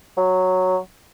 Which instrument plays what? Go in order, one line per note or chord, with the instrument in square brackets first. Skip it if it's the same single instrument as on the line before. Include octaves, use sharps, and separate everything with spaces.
[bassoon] F#3